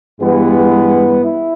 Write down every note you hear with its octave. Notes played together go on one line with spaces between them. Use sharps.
G2 E3 G#3 B3
E4